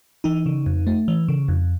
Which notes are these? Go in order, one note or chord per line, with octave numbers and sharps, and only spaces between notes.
E3 D#4
C#3
F2
A3
E3
C#3
F2